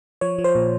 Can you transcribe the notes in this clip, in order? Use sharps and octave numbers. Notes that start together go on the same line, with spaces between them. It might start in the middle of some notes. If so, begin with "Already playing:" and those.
F3 C#5
F3
C5
A#2